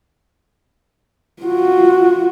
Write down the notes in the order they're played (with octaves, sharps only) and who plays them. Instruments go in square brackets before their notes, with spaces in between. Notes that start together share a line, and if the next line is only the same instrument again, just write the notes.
[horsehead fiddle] F4 F#4